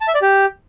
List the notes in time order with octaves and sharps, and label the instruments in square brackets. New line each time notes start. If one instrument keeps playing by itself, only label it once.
[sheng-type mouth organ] A5
E5
D5
G4